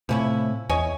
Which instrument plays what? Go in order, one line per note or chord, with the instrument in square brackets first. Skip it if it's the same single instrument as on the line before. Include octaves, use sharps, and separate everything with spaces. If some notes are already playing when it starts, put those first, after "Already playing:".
[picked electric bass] A2 C3 [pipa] F3 C#4 E4
[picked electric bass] E2 [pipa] C#5 D#5 G#5